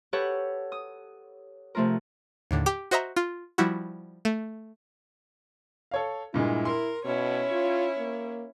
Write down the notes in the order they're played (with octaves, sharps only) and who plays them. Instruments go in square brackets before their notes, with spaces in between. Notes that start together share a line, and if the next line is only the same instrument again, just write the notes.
[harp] G4 A4 B4 C#5 F#5
D#6
C3 F3 A3 F4 A#4
[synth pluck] D#2 A2 D3
G4 D6 D7
F#4 C5 D#5 E5 A#5
F4
F3 G3 E4 F#4
A3
[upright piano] A4 C#5 F5
[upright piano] G2 A#2 G#3 [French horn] E4
[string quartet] A#4 [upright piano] C6
[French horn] B2 [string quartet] C#4 E4 C#5
[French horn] F4
A#3